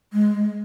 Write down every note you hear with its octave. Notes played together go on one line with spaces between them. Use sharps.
G#3